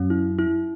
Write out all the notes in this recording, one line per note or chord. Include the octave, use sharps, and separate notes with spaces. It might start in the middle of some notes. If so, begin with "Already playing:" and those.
Already playing: F#2 F#3 C#4
E4
E4